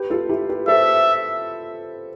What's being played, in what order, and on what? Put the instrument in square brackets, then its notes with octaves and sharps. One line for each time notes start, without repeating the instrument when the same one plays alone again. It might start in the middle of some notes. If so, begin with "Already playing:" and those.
Already playing: [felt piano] G4 B4
F4 A4
E4 G4
G4 B4
[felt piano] A4 C5 [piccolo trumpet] E5